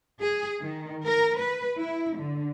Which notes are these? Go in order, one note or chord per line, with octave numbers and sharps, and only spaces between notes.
G#4
D#3
A#4
B4
E4
D3